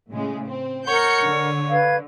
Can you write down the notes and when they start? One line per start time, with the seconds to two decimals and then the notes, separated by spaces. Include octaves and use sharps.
0.10 A2 C#3 G#3
0.47 C4
0.87 A#4 C#5 F#5 G6 C#7
1.23 D3
1.70 B4 F5 G#6